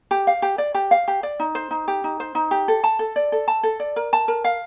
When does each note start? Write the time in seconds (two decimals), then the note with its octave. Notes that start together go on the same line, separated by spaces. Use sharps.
0.11 G4
0.27 F5
0.42 G4
0.58 D5
0.74 G4
0.91 F5
1.08 G4
1.23 D5
1.39 D#4
1.55 C5
1.71 D#4
1.88 G4
2.04 D#4
2.20 C5
2.35 D#4
2.51 G4
2.68 A4
2.84 A5
2.99 A4
3.16 D5
3.32 A4
3.48 A5
3.63 A4
3.80 D5
3.96 A#4
4.13 A5
4.28 A#4
4.44 F5